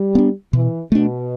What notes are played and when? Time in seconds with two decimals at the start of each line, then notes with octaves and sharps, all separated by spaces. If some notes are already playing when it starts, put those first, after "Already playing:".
Already playing: G3
0.15 B3 D4
0.53 B2 E3
0.92 B2 A3 D4